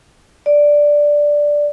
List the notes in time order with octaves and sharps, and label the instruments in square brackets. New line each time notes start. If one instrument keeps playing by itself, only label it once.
[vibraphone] D5